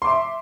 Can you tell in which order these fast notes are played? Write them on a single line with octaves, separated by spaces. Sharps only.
C6 D6 E5